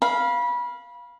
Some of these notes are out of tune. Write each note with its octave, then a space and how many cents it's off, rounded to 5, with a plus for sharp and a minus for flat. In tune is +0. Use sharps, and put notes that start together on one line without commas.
F5 +0 B5 -25